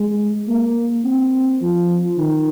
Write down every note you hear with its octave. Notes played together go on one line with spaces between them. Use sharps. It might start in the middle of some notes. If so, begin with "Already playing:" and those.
Already playing: G#3
A#3
C4
F3
D#3